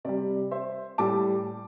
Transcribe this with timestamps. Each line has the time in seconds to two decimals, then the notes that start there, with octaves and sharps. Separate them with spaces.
0.05 C3 G3 D5
0.51 C5 E5
0.98 A2 G3 A5 D6